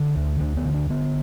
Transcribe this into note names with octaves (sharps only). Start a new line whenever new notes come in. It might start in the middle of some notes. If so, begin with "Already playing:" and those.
Already playing: D3 D4
D2
D2 D4
B3
D3
D4
D3 B3